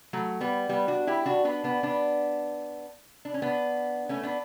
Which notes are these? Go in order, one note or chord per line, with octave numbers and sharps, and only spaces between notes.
F#3 A3
G3 B3
G3 B3
D4 F#4
E4 G4
D4 F#4
B3 D4
B3 D4
B3 D4
D4
C#4
B3 D4
A3 C#4
B3 D4